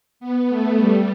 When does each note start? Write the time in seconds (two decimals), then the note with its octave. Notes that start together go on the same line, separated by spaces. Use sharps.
0.20 B3
0.49 A3
0.77 G3